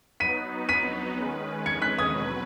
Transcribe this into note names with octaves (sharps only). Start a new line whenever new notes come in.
F#3 B3 D#4 B4 B6 D#7
B6 D#7
D#3 G#3 C#4 B4
G#6 C#7
F#6 B6
D#6 G#6
B2 F#3 B4